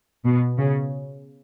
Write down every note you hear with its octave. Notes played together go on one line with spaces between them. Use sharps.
B2
C#3